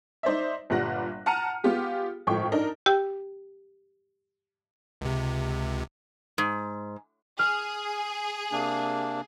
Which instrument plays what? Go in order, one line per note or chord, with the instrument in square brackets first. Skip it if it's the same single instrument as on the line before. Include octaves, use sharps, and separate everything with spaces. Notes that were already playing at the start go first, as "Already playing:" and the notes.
[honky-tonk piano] D#4 C5 D5 E5
G1 A#2 G3 F#5 F#6 A#6
F#5 A5 A#5 F6 C#7 D#7
B3 F4 G4 G#4
G#1 A2 F3 G5 C#6
D4 D#4 A#4
[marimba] G4 G5 E6
[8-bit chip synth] C#2 C3
[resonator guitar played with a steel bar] G#2
[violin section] G#4 [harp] F6
[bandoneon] C3 A#3 D4